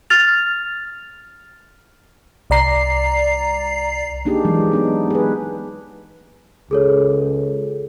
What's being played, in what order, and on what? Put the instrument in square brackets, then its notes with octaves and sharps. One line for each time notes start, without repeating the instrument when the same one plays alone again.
[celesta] F6 A6 F7
[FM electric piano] C2 D5 A#5 C7
[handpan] A#3 D4 D#4 G4 G#4
E3 F#3 G#3
B3 D4 D#4
G#4 B4
[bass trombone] C#2 [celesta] G#4 A4 C#5